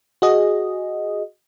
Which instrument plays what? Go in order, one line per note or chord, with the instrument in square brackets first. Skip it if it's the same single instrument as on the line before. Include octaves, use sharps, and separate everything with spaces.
[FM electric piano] F#4 G#4 D#5